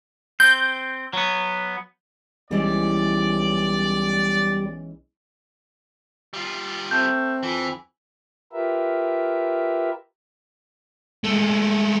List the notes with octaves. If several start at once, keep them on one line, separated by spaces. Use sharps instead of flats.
C4 G6
F#3 B3
B1 E3 G3 G#3 C#4 D5
G3 F4
A3 C4 G6
F2 E3 G#5
F4 G4 A#4 B4 E5
G#3 A3